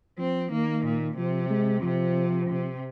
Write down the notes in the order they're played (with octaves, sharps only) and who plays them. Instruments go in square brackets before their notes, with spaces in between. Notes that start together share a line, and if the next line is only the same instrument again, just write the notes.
[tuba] F3 [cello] C4
[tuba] D#3 [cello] A#3
[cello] A#2
[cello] C3 [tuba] F3
[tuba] G#3
[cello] C3 [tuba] F3
[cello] C3